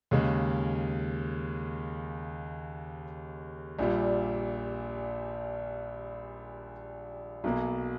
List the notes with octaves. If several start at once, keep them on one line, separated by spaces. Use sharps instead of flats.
D#2 C#3 G#3
A#1 A#2 G3
B1 B2 A#3